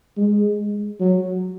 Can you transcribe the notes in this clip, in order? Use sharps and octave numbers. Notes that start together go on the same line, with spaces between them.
G#3
F#3